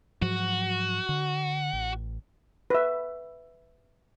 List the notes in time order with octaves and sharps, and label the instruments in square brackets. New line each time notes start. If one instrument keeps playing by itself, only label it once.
[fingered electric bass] G#2 F3 F#3 [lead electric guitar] F#4
[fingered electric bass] D3
A1
[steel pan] B4 E5